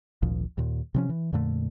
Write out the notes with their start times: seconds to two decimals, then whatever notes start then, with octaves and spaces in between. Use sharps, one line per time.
0.23 G#1 D2 A#2 F3
0.58 D#2 A#2
0.94 C3 F3 C#4
1.09 E3
1.32 F2 A#2 D3 A3